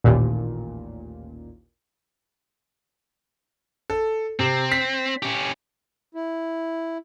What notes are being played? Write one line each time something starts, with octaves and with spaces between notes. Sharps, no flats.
A1 D#2 A#2
A4
C3 C4
B6
C#4 G4
E4